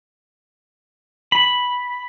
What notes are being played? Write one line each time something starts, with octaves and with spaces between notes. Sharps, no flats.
B5